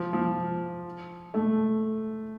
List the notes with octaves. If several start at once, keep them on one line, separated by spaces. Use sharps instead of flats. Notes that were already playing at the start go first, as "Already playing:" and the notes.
Already playing: F3
F3
A3